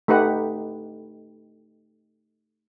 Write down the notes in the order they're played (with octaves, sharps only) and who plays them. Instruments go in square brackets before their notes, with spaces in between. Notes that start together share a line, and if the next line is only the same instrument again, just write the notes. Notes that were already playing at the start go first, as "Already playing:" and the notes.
[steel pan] A3 D#4 G4 B4 F#5